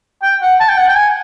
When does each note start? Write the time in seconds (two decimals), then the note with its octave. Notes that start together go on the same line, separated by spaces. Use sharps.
0.23 G5
0.42 F#5
0.60 A5
0.69 G5
0.78 F#5
0.88 G5
0.96 G#5